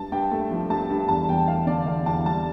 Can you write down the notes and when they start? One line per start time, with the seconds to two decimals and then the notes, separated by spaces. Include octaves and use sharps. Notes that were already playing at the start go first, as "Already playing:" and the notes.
Already playing: G2 A5
0.12 G2 G5
0.31 A3
0.51 F3
0.70 G2 A5
0.90 G2
1.08 E2 A5
1.29 E2 G5
1.48 A3 F5
1.67 D3 D5
1.86 E2 F5
2.06 E2 A5
2.26 G3 A5